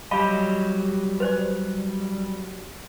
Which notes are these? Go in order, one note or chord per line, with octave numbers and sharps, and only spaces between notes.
F#3 G3 G4 D#5 F5 B5
B4 C5 D5